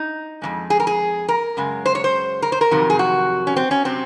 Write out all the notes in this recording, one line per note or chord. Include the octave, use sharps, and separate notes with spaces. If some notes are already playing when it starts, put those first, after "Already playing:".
Already playing: D#4
F2 C#3 G#3
G#4
A#4
G#4
A#4
F#2 C#3 G#3
C5
C#5
C5
A#4
C5
A#4
F2 C3 D#3 F#3
G#4
F#4
C#4
C4
C#4
C3 F#3 C4